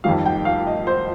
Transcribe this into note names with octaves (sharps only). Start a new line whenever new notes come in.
F2 D#3 G3 F5
G5
F5
D#5
C5